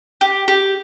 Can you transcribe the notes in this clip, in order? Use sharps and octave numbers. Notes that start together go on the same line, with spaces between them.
G4
G4